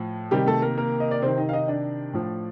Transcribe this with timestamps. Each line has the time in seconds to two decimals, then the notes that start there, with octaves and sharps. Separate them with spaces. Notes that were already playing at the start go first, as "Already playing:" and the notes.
Already playing: A2 F3
0.31 C3 D#3 G3 G4
0.46 A3 A4
0.62 A#3 A#4
0.77 A#3 A#4
1.00 D#5
1.11 D5
1.22 C3 D#3 C4 C5
1.38 D#4 D#5
1.49 F5
1.53 D#4 D#5
1.68 D4 D5
2.13 A2 F3